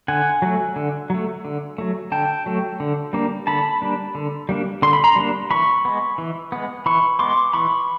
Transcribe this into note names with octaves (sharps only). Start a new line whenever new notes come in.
D3 F#5 G#5
F#3 A3
D3
F#3 A3
D3
F#3 A3
D3 G5 A5
F#3 A3
D3
G3 A#3 D4
D3 A5 B5
G3 A#3 D4
D3
G3 A#3 D4
D3 C6
B5
A#5 C6
G3 A#3 D4
E3 B5 C#6
G#3 B3
E3
G#3 B3
E3 B5 C#6
G#3 B3 C6 D6
E3 B5 C#6